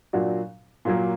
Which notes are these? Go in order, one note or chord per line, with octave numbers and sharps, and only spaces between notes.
A#2 F#3 D4 F#4
A#2 F#3 A#3